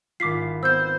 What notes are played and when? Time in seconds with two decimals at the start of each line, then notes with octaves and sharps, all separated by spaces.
0.20 G#1 F4 D6 B6 C7
0.63 B3 C4 C5 E6 G6